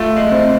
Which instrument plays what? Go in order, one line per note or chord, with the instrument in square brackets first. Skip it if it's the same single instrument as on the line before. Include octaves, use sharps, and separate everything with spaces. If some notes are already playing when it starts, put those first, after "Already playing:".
Already playing: [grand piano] A3 [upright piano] F4
[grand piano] G#3
[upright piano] C4